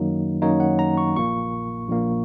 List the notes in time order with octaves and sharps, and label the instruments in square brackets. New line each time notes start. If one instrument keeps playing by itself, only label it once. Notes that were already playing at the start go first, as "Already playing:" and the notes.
Already playing: [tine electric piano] F#2 D#3 F#3 A#3 D#4
F#2 D#3 F#3 A#3 D#4 C#5
F#5
A#5
C#6
A#1 A#2 A#3 C#6
A#1 A#2 A#3